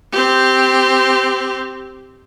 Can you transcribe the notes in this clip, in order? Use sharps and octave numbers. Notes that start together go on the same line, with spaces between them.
C4 G4